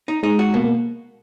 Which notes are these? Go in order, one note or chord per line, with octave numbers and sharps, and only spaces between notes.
D#4
G#3 D#4
F#4
B2 A#3
A#3